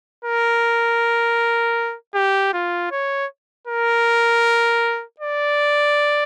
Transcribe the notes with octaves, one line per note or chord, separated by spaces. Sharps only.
A#4
G4
F4
C#5
A#4
D5